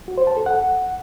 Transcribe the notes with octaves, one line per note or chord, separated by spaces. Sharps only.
F#4
C5
A5
A4
F#5